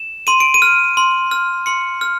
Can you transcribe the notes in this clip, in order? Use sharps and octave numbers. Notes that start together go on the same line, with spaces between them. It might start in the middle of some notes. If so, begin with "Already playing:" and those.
Already playing: E7
C6 D#7
D7
D#7
F6
C6
F6
C6 C#7
F6